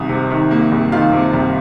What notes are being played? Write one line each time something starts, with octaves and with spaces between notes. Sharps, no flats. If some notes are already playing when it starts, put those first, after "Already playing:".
Already playing: C2 D#3 D#6
C3
D#3
A#3
C2
D#3 F4 F5
C3
C2